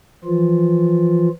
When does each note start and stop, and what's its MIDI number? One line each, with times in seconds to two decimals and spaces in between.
0.24 1.29 52
0.24 1.29 53
0.24 1.29 65